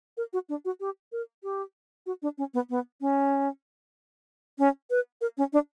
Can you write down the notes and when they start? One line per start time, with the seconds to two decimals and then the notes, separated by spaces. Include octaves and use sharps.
0.17 A#4
0.33 F#4
0.49 D4
0.65 F#4
0.80 G4
1.12 A#4
1.43 G4
2.06 F#4
2.22 D4
2.38 C#4
2.54 B3
2.70 B3
3.01 C#4
4.59 C#4
4.90 B4
5.21 A#4
5.38 C#4
5.53 D4